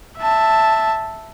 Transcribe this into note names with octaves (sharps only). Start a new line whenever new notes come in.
E5 A5